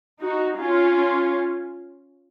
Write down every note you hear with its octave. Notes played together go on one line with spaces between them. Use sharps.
D#4 F#4
C#4 F4